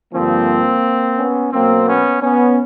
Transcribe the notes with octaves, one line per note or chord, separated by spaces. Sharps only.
G2 D3 F3 A#3 C4
B3 C#4
B2 F#3 A#3 C4
B3 C#4
B3 C#4